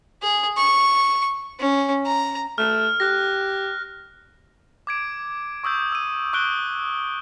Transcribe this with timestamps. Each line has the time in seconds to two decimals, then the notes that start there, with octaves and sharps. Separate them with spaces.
0.22 G#4
0.57 C#6
1.60 C#4
2.06 A#5
2.58 A3 F6
3.00 G4 F#6 A#6
4.87 D6 G#6 D7
5.64 C#6 D#6 E6 G6
5.92 E6 D#7
6.33 C#6 D#6 F#6 D7 G7